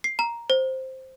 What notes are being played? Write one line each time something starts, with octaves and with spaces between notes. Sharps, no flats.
C7
A#5
C5